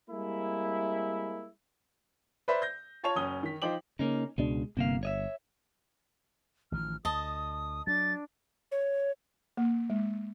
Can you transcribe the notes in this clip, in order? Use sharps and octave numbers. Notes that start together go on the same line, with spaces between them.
G3 G#3 A#3 C4 E4
B4 C5 D5 E5 B5
G6 A#6
F4 C#5 A5 C#6 G#6 F7
F#1 C#4 D#6 G7
D#3 B6
F3 D#4 C5 G5 D6 F#7
C#3 A#3 C#4 D#4
C#2 B2 G#3 D4
G1 C3 A#3 F5
C#5 D#5 E5
A1 D#3 F3 F6
D2 D#5 A5 D#6
F#3 D4 A6
C#5
A#3
G#3